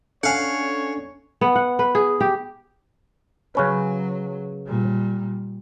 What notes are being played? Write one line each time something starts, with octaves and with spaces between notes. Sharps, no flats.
C#4 D4 A4 C#5 F5 F#5 G#5
B3
F#5
B4
G#4
G4
C#3 F#3 C#4 B4
A#2 G3